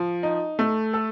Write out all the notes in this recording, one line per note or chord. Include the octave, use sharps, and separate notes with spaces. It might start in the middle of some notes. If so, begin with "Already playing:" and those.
Already playing: F3
D#4
A3
A4